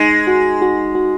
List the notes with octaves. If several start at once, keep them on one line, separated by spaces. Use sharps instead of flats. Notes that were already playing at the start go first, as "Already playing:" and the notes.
Already playing: G#3 D#4
F#4
F#4
F#4